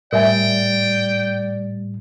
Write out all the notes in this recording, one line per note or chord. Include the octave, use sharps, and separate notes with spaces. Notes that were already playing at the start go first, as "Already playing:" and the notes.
A2 G3 A#4 D5 E5 G5 G#5